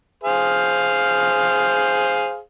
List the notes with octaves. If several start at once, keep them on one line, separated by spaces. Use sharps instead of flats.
G#4 C5 F5